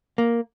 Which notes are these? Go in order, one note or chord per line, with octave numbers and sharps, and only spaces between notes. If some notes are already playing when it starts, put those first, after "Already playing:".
A#3